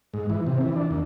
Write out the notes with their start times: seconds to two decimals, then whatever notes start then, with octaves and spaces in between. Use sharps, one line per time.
0.14 G#2
0.30 E3
0.47 C3
0.61 E3
0.76 D4
0.91 D#2